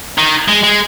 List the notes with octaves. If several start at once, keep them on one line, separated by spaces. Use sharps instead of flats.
D#3
G#3
G#3